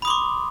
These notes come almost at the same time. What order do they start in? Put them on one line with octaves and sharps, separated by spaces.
B5 D#6 C6 D6